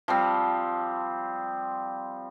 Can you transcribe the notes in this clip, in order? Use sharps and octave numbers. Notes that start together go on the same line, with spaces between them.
F3 G3 C4